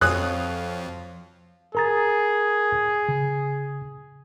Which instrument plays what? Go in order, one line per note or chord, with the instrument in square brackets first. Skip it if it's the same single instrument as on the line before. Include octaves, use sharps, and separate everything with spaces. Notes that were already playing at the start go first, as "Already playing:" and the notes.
[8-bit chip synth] F2 [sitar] F4 F#4 C#5 [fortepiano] D#6 F#6
[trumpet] G#4 [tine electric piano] A#4 A#5 A6
[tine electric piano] C#3